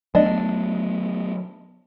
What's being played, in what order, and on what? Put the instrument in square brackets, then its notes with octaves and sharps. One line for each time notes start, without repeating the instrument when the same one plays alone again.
[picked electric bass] F#3 A3 B3 [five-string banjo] D4 D#5